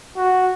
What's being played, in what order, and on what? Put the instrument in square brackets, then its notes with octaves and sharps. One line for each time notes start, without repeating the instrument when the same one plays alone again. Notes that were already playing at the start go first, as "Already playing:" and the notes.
[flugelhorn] F#4